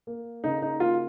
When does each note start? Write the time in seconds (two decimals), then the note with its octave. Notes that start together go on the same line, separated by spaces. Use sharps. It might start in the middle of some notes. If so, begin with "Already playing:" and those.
0.07 A#3
0.44 C#3 D#4
0.62 D#4
0.80 A#3 F4